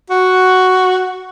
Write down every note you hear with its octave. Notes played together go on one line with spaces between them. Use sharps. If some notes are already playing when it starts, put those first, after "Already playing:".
F#4